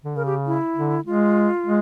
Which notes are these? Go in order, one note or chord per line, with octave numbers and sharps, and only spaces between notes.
D3
C#3 A#4
G4
E4
D3
G#3 F4
G#3